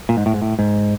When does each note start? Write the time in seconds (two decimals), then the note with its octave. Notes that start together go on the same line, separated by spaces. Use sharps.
0.09 A#2
0.17 G#2
0.26 A2
0.34 G#2
0.42 A2
0.59 G#2